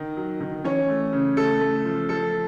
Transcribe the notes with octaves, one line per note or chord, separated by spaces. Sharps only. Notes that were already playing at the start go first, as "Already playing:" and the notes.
Already playing: D#3
F#3
D#3
E3 C#4 C#5
A3
C#3
A3 A4
A3
F3
F3 A4